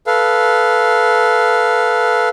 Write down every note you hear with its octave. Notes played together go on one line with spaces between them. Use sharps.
A4 B4 F5